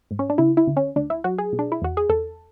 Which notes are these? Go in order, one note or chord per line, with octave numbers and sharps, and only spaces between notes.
G#2
C#4
D4
C#3 E4
E4
D2
C#4
D2 D4
E4
F#3 F#4
G#4
B2
D4
E4
E2 F#4
G#4
E2 A4